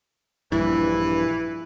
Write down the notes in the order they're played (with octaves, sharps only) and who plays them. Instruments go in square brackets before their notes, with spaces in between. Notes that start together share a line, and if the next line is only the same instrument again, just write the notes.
[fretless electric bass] A#1 G2 [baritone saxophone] E3 [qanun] E4